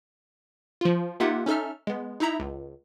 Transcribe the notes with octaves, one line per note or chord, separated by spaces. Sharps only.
F3 F4
A#3 D#4 F4 G4 E5 F#5
C#4 D#4 A4 E5 F6
G#3 B3
D#4 E4 E5 A#5 B5
C#2